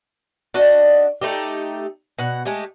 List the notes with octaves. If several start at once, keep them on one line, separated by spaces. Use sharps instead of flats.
D4 F#4 D#5
A3 D#4 G4
B2 F#5
G#3 A3 G4